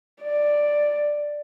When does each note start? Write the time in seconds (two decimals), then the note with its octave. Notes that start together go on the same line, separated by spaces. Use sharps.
0.23 D5